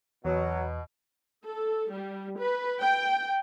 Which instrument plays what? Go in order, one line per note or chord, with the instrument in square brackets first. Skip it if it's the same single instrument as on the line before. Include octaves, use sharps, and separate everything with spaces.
[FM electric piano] E2 [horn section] B2 [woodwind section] F#3
[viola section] A4
G3
B4
G5